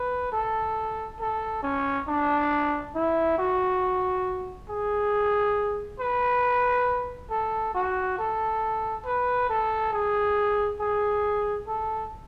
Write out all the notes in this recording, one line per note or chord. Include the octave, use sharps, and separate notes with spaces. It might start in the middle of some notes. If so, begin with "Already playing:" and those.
Already playing: B4
A4
A4
C#4
D4
E4
F#4
G#4
B4
A4
F#4
A4
B4
A4
G#4
G#4
A4